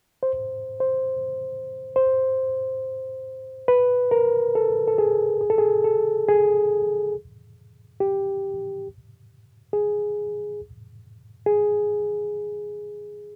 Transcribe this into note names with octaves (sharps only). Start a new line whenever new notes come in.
C5
C5
C5
B4
A#4
A4
A4
G#4
G#4
A4
G#4
A4
G#4
G4
G#4
G#4